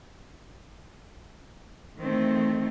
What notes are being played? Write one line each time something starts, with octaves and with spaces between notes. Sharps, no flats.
D#3 E3 A3 C4